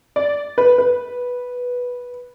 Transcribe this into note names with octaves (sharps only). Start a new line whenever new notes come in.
D5
B4
B4